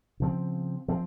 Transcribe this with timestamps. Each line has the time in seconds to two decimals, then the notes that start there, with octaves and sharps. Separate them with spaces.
0.20 C#3 F3 C4
0.88 F3 C4